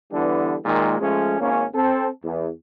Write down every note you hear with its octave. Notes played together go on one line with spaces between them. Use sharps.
D3 E3 G3 B3 D4
A#2 D#3 G#3
F3 G#3 A3 C#4
G#1 A#3 C#4
C4 A4
E2